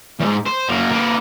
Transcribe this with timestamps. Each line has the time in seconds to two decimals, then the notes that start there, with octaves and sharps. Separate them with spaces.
0.19 E2 G#2
0.46 C5
0.68 F#2 A#3
0.91 A#3 B4